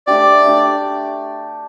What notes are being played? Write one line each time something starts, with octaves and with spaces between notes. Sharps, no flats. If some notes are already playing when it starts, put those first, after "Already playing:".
A3 D4 G4 D5
A3 D4 G4